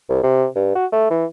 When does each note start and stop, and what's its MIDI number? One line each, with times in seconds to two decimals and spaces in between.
0.09 0.23 36
0.23 0.46 48
0.55 0.74 43
0.75 0.86 66
0.92 1.07 57
1.10 1.25 52